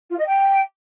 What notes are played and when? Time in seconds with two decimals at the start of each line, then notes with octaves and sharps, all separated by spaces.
0.10 F4
0.18 D#5
0.26 G5